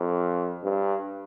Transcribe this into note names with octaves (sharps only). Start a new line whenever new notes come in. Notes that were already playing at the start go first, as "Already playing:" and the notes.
Already playing: F2
G2